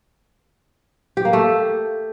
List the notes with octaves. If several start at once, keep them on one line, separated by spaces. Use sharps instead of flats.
G4
A#3
A3